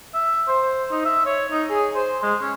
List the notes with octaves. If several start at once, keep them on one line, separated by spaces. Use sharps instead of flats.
E5
C5
D#4
E5
C#5
D#4
G#4
C5
G#3
C#4